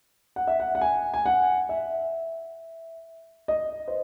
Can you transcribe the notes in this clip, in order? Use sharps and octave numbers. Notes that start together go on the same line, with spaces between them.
F#5
E5
F#5
F#5
G#5
G#5
F#5
E5
D#5
C5